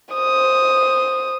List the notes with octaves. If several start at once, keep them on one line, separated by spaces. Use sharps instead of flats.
C5 D#6